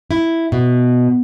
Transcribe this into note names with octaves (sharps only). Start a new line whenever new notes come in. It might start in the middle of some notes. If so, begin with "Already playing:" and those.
E4
B2